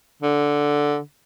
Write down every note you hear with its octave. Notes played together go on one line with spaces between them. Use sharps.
D3